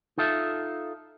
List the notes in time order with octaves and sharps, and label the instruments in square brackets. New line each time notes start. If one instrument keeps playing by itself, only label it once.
[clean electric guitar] D#4 F4 A4 E5